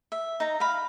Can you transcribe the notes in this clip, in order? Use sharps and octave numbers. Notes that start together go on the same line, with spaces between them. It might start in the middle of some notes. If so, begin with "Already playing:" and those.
E5
D#4 A#5
F5 B5